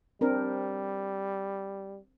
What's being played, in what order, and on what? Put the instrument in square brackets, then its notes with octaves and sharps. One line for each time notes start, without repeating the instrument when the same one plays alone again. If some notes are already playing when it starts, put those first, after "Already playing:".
[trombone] G3 [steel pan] C4 D4 A#4